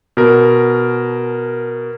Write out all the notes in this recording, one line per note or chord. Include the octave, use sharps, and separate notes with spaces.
B2 A#4